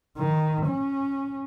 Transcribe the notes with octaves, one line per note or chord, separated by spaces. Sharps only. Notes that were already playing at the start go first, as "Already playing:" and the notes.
D#3
C#4